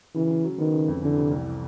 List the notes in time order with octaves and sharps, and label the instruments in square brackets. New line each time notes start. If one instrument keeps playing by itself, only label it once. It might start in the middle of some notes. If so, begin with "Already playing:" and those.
[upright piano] C#3 [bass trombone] E3
[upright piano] C#3
F#3
[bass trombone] D#3 [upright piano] B3
[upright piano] C#3
F2
[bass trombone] D3 [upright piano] E3
[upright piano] C3
C2